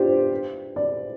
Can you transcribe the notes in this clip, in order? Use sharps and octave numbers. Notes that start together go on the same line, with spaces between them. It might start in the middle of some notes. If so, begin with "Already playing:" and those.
Already playing: D4 F4 G4 C5
D5